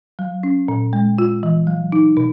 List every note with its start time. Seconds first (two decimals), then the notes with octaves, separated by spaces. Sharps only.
0.19 F#3
0.43 C#4
0.68 A#2
0.93 G#3
1.18 F4
1.43 E3
1.67 F#3
1.92 D#4
2.17 B2